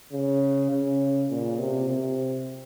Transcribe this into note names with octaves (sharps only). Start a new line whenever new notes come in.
C#3
C#3
A#2
C3
C3